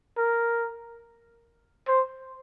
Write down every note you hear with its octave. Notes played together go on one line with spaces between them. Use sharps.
A#4
C5